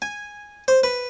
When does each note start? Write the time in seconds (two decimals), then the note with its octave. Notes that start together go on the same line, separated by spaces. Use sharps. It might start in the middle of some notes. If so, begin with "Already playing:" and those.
0.02 G#5
0.68 C5
0.83 B4